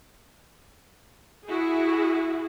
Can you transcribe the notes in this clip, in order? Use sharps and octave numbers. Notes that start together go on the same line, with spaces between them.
E4 F#4 G#4